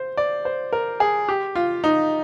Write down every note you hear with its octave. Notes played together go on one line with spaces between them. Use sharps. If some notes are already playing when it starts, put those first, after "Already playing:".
Already playing: C5
D5
C5
A#4
G#4
G4
F4
D#4